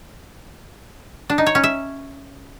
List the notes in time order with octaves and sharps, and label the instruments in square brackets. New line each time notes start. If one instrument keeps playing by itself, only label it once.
[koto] D4
D#4
C#5
C#4
E5